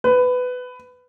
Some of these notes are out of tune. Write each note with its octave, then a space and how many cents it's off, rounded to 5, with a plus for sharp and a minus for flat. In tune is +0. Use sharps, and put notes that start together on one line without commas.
B4 +15